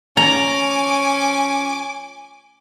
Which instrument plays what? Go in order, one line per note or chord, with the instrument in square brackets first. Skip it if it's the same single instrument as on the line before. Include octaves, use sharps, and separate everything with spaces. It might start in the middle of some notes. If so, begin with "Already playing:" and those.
[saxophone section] F3 C#4 [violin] G#5 D6 [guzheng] A#5